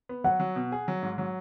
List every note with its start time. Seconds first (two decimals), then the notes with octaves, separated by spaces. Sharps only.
0.09 B3
0.24 F#3 F#5
0.40 F#3
0.56 B2
0.72 G#4
0.88 F#3
1.03 G#2
1.18 F#3